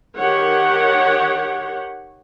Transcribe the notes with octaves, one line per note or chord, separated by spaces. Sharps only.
D#3 G4 C#5 F#5